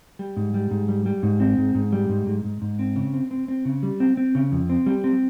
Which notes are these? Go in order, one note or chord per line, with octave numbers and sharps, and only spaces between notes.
G3
G#2
G3
G#2
G3
G3
G#2
C4
G#2
G#2
G3
G#2
G#2
G#2
G#2
C4
C#3
C4
C4
C4
C#3
G3
C4
C4
C#3
F2
C4
G3
C4